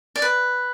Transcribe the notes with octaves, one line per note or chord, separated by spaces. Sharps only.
D5
B4